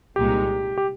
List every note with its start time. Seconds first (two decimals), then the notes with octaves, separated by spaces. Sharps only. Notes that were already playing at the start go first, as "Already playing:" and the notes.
0.16 C2 A#2 G#3 D#4 G4
0.78 G4